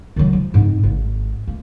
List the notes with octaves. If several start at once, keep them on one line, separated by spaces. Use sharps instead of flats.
D#3 F#3
F3
G#2 C4
G#1
A#3